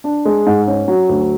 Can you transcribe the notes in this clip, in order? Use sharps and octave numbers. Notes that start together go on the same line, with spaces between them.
D4
G#3
G#2
C#4
F#3
D2